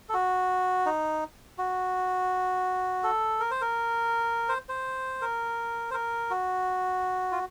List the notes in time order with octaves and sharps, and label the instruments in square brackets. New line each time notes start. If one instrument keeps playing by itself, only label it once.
[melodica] A4
F#4
D#4
F#4
A4
A#4
C5
A#4
C5
C5
A#4
C5
A#4
F#4
F4